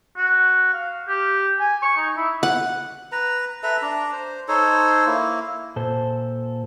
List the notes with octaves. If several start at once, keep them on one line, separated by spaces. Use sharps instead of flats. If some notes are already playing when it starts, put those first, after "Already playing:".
F#4
F5
G4
G#5
C#6
D#4
E4
F#5
B4 A#5
A4 B4 E5 A#5
D4 A#5
C5
D#4 A4 C5 C#5
A#3 E4
A#2 A4 C5